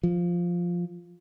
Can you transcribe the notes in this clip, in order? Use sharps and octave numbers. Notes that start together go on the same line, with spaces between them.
F3